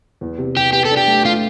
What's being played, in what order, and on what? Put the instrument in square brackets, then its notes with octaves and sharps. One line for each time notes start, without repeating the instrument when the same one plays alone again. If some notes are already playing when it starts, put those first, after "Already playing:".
[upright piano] E2
C3
[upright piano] E2 [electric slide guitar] G4
[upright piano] B3 [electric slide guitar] G4
[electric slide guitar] A4
[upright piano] D4
[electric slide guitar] G4
[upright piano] A3
[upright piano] A3 [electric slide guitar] F4